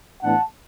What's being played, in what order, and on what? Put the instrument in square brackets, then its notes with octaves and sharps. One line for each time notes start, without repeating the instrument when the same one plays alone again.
[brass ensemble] A2 E3 B3 D4 F#5 A5